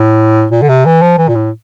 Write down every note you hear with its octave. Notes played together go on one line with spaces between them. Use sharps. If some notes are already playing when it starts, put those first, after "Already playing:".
Already playing: A2
A#2
D3
C3
E3
F3
E3
A#2
A2